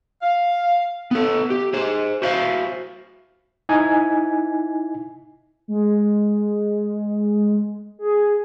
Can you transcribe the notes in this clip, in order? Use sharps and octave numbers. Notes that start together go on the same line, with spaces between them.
F5
B3 A4
G4
G#4 C5
F#4 C5 E5 F5
D#4 E4 G#5
G#3
G#4